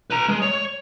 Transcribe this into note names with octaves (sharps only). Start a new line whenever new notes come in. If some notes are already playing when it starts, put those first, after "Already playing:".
B4 A#5
G#3
C#5